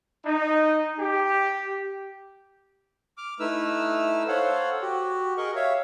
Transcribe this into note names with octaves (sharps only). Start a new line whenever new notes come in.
D#4
G4
D6 F6
A3 D#4 E4 B4 E6 F6
A4 C5 C#5 F5 F#5
F#4 G4
G#4 A#4 D#5 C#6
C#5 E5 F5